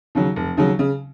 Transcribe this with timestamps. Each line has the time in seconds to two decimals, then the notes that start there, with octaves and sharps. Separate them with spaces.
0.15 D#2 C#3 F#3
0.36 F1
0.57 D#2 C#3 F#3
0.79 C#3